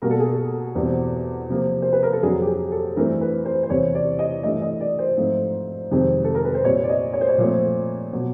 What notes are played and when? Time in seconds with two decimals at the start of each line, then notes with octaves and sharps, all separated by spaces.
0.02 B2 G3 A#3 A#4
0.11 A4
0.20 G#4
0.29 A4
0.75 E2 B2 G3 C4
1.49 C3 F3 A#3
1.82 C5
1.93 B4
2.03 A#4
2.13 A4
2.23 F2 D3 F#3 G#4
2.42 G4
2.47 G#4
2.72 A4
2.96 G2 E3 A3 C4 A#4
3.21 B4
3.45 C5
3.63 C5
3.70 E2 C3 E3 G3 C4 C#5
3.95 D5
4.19 D#5
4.43 G2 E3 A3 D#5
4.62 D#5
4.80 D5
4.99 C5
5.17 G#2 F3 A3 C4
5.91 F2 C3 D#3 G#3 C4
6.24 A4
6.35 A#4
6.45 B4
6.54 C5
6.64 A#2 G3 C4 C#5
6.84 D5
6.89 D#5
7.13 C#5
7.21 C5
7.29 C#5
7.38 A#2 F3 A3 C4
8.13 B2 F#3